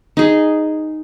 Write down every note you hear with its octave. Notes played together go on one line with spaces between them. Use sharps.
D#4 G#4